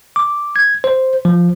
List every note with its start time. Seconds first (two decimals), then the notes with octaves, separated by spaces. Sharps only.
0.16 D6
0.56 G#6
0.84 C5
1.25 F3